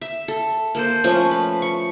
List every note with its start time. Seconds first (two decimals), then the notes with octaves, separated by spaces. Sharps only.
0.01 E5
0.28 A4
0.75 A#3 A4 C5
1.04 F3 A3 C#4
1.31 B4
1.62 C#6